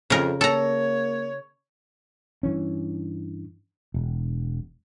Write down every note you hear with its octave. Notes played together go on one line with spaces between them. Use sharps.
F2 C#3 A#4
A#3 A4 C#5 A#5
G2 E3 C#4
E1